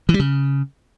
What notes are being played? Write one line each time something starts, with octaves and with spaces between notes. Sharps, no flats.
E3
G3
C#3